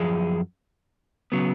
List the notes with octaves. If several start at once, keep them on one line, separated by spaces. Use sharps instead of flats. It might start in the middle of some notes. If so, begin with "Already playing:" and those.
Already playing: F#2 F3 G#4
C#3 F#3 B3